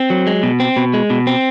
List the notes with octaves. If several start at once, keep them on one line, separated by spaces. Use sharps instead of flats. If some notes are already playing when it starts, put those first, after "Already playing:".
Already playing: C4
F#3
G#3
B2
C4
B2
G#3
B2
C4